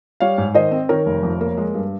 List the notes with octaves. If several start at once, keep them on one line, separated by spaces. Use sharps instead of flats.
G3 C#5 F5
G#2
D#3 C5 D#5
C4
D#3 A#4 C#5
F1
F2
A#3
G#3
G2